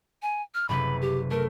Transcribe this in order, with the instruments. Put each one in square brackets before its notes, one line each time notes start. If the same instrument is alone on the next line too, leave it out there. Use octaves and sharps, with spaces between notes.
[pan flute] G#5
F6
[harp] F#1 C3 B4 [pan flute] B5
[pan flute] G4
[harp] A3 [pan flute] A#4